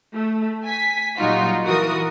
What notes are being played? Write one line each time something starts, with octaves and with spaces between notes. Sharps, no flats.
A3
G#5 B6
A#2 F#3 G3 D#4 F4 F#4
E3 F#4 A#4 D#6